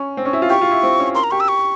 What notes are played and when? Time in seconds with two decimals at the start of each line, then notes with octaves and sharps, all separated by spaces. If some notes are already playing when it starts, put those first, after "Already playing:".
Already playing: C#4
0.17 C4
0.25 C#4
0.33 E4
0.42 F4
0.50 G4 C#6
0.61 F4
0.71 E4
0.83 C4
0.99 C#4
1.15 A#4 C6
1.24 A#5
1.31 G4 C#6
1.40 E6
1.48 C#6